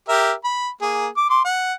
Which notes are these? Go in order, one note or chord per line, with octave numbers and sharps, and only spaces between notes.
G4 A#4 E5
B5
A#3 G#4
D6
C6 D6
F#5